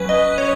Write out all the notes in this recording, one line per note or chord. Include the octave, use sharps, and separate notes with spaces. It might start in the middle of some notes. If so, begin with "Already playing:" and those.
Already playing: F#3 C#4 B4
D#5
C#5